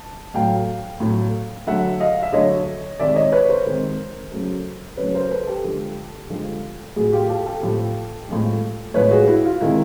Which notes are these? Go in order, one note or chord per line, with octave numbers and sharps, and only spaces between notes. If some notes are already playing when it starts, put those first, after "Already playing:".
Already playing: A5
A2 F#3 A3 F5 G5
A2 F#3 A3
D3 F#3 A3 E5 F#5
D#5 F5
E5
D3 F#3 A3 C#5 D#5
C3 D#3 G#3 D5 E5
C#5 D#5
B4 C#5
A#4 C5
C3 D#3 G#3
C#3 F#3 A3
C#3 F#3 A3 B4 C#5
A#4 C5
A4 B4
G4 A4
D3 F3 G#3
D3 F3 G#3
A2 F3 A3 F#4 G#4
F4 G4
G4 A4
G4 A4
A2 F3 A3
A2 F3 G#3
A2 F3 G#3 B4 C#5
F#4 G#4
E4 F#4
F4
C3 D#3 G#3 E4